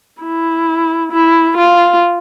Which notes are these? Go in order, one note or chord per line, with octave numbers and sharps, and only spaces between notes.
E4
E4
F4